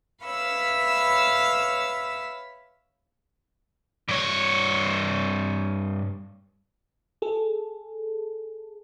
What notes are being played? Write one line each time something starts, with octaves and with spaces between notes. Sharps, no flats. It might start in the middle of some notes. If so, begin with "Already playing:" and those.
B4 C#5 E5 F5 B5 E6
G2 C#5
G#4 A4